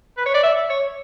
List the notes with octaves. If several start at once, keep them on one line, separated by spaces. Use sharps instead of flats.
B4
C#5
D5
E5
C#5